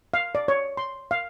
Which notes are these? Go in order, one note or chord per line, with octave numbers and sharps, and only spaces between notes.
F5
D5
C#5
C6
F5